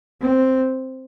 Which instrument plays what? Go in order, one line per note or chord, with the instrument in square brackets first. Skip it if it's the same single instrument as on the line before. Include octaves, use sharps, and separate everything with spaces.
[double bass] C4